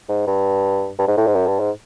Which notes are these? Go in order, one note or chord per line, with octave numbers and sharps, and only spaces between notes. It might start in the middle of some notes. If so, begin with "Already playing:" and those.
G#2
G2
G2
G#2
A2
G#2
F#2
G2
G#2